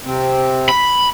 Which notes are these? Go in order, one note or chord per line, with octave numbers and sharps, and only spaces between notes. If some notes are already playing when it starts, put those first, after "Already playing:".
C3 C4
B5